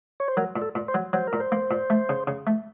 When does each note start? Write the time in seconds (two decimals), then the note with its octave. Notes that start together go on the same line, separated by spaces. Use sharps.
0.20 C#5
0.28 C5
0.37 F#3 A#4
0.56 A#2
0.62 A4
0.75 A#2
0.88 C5
0.94 F#3
1.13 F#3 C5
1.27 A#4
1.33 A#2
1.40 C5
1.52 A#3
1.71 A#2
1.90 A3
2.09 C#3
2.27 C#3
2.47 A3